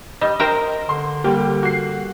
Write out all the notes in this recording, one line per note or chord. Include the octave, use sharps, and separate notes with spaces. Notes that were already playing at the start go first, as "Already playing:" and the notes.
G3 D#5
A#4 C5 G5
D3 C6
G3 A#3 G4
F#4 C7